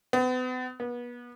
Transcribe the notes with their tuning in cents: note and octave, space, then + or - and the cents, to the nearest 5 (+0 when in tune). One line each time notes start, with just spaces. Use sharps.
B3 +40
B3 -30